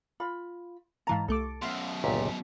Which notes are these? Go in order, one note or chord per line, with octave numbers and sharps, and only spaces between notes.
F4 B5
G#2 E3 F5 A5 A#5
C2 A3 A4 D6
F#2 B2 E5 F5 C6
G1 C#2 A#2 B6